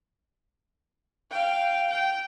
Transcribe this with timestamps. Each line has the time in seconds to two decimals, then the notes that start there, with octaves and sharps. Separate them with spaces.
1.31 F5 G5
1.90 G5